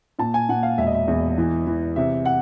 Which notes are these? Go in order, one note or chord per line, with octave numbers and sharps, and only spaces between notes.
A#2 A5
G#5
A#2 F#5
F5
E1 E5
D#5
E5
E2
E3
E3
C3 E5
F#5